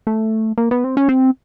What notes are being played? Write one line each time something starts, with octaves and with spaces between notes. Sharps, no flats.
A3
A#3
B3
C4
C#4
C4